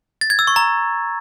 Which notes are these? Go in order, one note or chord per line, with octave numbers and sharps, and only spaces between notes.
A6
G#6
E6
C#6
A#5